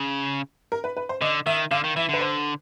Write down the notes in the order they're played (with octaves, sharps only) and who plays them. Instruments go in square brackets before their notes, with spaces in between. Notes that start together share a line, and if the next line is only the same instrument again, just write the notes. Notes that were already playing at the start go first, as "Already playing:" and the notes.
Already playing: [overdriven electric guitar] C#3
[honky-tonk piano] A#4
B4
B4
C5
[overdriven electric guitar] D3 [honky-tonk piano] D#5
[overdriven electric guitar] D#3 [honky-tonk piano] E5
[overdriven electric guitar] D3 [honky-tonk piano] F5
[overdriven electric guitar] D#3
[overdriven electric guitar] E3 [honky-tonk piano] E5
[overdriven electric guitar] D3 [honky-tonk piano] B4
[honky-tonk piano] C5